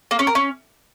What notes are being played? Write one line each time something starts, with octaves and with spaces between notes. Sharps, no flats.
A#3
C#4
A#4
C#4